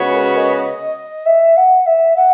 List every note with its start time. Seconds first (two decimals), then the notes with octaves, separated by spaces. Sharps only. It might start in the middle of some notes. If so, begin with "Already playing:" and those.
Already playing: C#3 G#3 B3 F#4 C#5
0.14 A#4
0.36 D#5
1.25 E5
1.56 F#5
1.86 E5
2.16 F#5